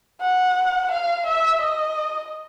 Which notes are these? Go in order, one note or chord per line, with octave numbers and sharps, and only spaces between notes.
F#5
F5
E5
D#5